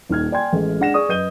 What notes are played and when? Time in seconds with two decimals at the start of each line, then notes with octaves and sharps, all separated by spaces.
0.09 D#1 D#3 F6 G#6
0.32 D5 G5 G#5 C6 G#6
0.53 A1 G#3 A3
0.79 G#3 D4 F#5 A#6 E7
0.94 G#4 D5 C#6 D#6
1.09 F#2 B4 D#5 G6 D#7 G7